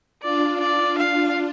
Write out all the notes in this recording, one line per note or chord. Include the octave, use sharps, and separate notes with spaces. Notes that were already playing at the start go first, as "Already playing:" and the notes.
D4 F4 D5
D5
F5